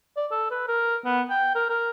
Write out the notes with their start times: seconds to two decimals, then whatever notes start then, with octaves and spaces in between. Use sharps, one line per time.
0.16 D5
0.31 A4
0.51 B4
0.68 A#4
1.05 B3
1.30 G5
1.55 A#4
1.69 A#4